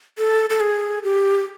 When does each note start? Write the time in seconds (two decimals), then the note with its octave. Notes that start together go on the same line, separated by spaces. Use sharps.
0.18 A4
0.50 A4
0.60 G#4
1.04 G4